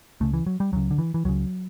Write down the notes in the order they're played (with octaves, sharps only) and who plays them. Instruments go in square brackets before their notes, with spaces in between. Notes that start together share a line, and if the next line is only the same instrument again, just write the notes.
[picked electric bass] C#2 C#3 A3
E3
F#3
G3
C#2 C#3 F#3
D3
E3
E3
C#2 C#3 F#3